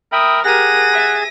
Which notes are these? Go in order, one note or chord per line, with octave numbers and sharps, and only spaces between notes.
A#4 E5 G5 B5 D#6
G4 G#4 A#4 F#5 A#6 D#7
E5